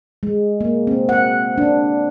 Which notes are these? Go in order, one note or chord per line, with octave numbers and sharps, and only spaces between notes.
G#3
A#3
C4
F#5
D4